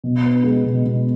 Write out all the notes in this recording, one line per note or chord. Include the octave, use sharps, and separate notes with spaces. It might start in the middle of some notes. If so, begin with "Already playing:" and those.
B2
B3
G#3
B2
B2